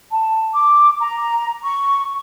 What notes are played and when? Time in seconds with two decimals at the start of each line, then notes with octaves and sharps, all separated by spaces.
0.09 A5
0.53 D6
0.99 A#5
1.62 C#6